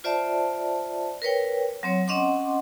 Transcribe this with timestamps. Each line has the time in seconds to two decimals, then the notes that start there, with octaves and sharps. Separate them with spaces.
0.04 F4 C5 D5 E5 A5
1.22 A#4 B4 C#5 G5
1.83 F#3 C4 C#5
2.08 C4 C#4 D#5 F#5 C6 D6